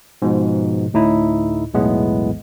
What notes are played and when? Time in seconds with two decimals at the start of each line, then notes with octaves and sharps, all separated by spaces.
0.22 G#2 B2 F3
0.93 D2 A2 D#4 E4
1.74 B1 E2 A2 E3 G#3 B3